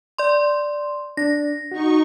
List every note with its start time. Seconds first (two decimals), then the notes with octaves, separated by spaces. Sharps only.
0.18 D5 C6
1.17 D4 A#6
1.71 D#4 F#4 C#6